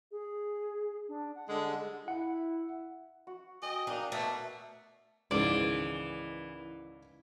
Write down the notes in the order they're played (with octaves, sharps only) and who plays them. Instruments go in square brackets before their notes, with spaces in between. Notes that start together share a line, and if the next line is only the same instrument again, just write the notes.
[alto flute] G#4
D4
F#5
[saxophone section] D3 G3 G#3
[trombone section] E4 [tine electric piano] F#5
[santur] F#4
[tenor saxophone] D#5 [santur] G5 G#5
[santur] A#3 A#5 D#6 [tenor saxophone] D4 [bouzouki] D#4
[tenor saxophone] B2 [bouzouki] A3
[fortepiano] C#2 G#2 D#3 [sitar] E3 [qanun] C#4 G#4 C5 [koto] D5